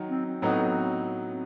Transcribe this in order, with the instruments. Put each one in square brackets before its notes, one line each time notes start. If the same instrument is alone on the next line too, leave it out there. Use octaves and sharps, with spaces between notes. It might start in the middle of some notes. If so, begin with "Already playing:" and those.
Already playing: [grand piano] D#3 F#3
[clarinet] C4
C4
[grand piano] A2 F#3 B3 D#4 F#4